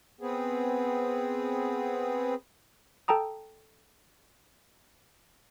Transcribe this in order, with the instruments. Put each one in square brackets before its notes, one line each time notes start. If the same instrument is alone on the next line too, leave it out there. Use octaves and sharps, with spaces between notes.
[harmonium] B3 C4 G#4
[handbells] A4 G5 A5 A#5 D#6